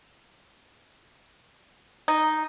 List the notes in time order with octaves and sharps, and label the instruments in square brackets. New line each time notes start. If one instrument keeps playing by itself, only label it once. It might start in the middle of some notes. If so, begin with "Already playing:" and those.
[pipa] D#4